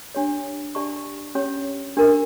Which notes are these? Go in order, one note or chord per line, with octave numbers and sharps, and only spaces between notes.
D4 G4 C#5
D4 G4 D5 A5 C#6
C#4 G4 C#5
D4 G4 A#4